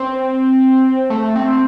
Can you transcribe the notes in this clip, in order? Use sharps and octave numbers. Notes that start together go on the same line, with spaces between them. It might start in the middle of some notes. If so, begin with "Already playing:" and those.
Already playing: C4
A3
C4